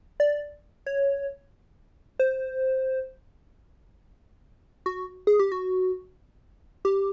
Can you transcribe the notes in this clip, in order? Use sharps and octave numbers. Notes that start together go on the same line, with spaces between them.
D5
C#5
C5
F#4
G#4
G4
F#4
G4